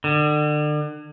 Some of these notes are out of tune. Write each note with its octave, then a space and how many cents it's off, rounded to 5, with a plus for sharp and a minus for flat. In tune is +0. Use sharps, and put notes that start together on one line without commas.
D3 +35